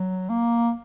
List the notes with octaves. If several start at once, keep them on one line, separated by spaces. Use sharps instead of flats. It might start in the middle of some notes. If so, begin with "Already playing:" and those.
Already playing: F#3
A#3